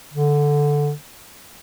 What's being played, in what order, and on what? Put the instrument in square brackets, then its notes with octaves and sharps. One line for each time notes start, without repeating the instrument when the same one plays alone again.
[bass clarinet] D3